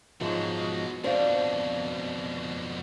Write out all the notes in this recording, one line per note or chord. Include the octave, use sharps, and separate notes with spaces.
G#2 B2 F3 F#3 G#3
F2 B2 D4 C5 F5